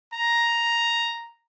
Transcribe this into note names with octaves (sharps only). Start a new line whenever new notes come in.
A#5